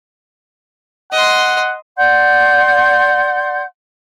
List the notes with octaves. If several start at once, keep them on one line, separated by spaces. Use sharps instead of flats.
D#5 F#5 C6
D5 F#5 C6 G6